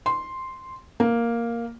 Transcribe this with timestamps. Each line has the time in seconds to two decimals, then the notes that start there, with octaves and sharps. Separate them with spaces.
0.06 C6
1.00 A#3